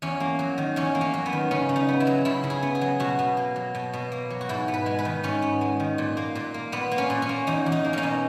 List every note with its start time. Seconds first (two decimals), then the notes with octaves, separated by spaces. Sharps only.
0.02 E2 C#4
0.20 A#3
0.39 F#3
0.58 D#3
0.76 E2 C#4
0.95 A#3
1.01 C#4
1.14 F#3
1.26 B3
1.33 D#3
1.51 C#3 C#4
1.69 C#3
1.76 D#4
1.89 B3
2.00 E4
2.07 F#3
2.25 C#3 E4
2.44 C#3
2.50 G#4
2.63 B3
2.75 G#4
2.81 F#3
3.00 B2 F#4
3.19 B2
3.37 A#3
3.56 F#3
3.75 B2
3.93 B2
4.12 A#3
4.30 F#3
4.41 F#4
4.49 G#2 E4
4.68 B3
4.74 B4
4.86 G#3
4.99 B4
5.05 D#3
5.23 G#2 C#4
5.42 B3
5.61 G#3
5.80 D#3
5.98 A#2
6.17 A#3
6.35 A#2
6.54 A#3
6.72 A#2 B3
6.92 A#3
6.98 C#4
7.10 A#2
7.22 C#4
7.29 A#3
7.47 E2 D#4
7.66 E2
7.72 D#4
7.85 A#3
7.93 C#4 D#4
8.03 B2